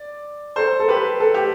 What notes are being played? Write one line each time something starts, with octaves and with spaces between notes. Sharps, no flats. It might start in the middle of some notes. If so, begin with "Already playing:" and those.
Already playing: D5
A4 C5
A4
G4 B4
A4
G4